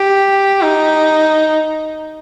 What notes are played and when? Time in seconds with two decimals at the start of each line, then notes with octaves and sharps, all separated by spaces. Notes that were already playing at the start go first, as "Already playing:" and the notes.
Already playing: G4
0.62 D#4